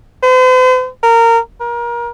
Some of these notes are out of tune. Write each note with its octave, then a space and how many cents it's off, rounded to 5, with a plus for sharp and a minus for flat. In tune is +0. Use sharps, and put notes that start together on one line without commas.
C5 -45
A#4 -20
A#4 +30